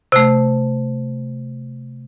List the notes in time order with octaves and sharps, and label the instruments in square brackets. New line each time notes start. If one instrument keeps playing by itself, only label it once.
[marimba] C3 A3